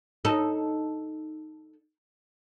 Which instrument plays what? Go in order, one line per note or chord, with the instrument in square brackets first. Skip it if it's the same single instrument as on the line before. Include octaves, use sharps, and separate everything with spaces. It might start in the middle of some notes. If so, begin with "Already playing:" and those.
[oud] D#4 A4